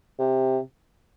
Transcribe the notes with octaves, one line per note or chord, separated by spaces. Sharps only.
C3